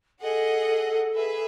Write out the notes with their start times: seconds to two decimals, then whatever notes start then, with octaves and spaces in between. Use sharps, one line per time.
0.22 G#4 A4 D#5 F#5
1.14 G#4 B4 E5